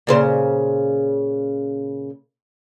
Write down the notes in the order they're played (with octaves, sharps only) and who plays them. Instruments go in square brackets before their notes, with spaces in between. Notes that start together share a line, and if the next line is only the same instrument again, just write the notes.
[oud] A#2 C#3 C5